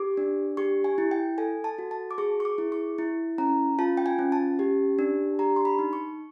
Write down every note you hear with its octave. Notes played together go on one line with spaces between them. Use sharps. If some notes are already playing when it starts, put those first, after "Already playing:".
Already playing: G4 D6
D4
G4 C#6
G#5
E4
G5
A4 G#5
A5
F#4
A5
D6
G#4 C#6
C#6
D6
E4
C#6
E4
C#4 A#5
F4 A5
G5
G#5
C#4
A5
G4
D4
G4 A#5
C6
B5
D#4
C#6